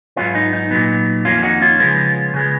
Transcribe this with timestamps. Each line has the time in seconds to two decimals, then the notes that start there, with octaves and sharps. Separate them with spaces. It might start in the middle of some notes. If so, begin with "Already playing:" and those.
0.16 G#2 F#3 B3 C#4 F4
0.35 D#4
0.53 D#4
0.71 A#2 F#3 B3
1.25 F2 D#3 A#3 C#4 F4
1.43 D#4 F#4
1.61 C#4 F4
1.79 C#3 F3 G#3 B3
2.34 C#3 G#3 B3